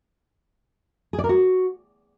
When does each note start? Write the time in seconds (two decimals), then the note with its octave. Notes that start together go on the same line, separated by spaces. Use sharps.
1.13 G#4
1.19 D5
1.24 A#4
1.29 F#4